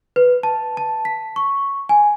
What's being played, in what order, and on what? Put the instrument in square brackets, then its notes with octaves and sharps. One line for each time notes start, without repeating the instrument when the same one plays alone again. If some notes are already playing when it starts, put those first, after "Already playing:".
[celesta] B4
A5
A5
B6
C#6
G#5